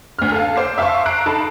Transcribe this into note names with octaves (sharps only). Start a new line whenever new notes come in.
D2 F6
A4 F5
C5 D6 C7
E5 F5 A5 C6 C#6
A#5 F#6 C7 D7
D#4 A4 A5 B5